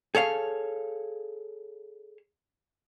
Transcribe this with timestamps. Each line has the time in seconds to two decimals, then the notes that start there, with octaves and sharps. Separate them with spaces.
0.15 G#4 A4 C#5 F5